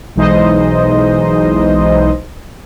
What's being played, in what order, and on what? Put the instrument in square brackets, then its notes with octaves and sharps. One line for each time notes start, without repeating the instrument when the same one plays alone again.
[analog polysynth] B1 E3 G#3 D#4 C5 D#5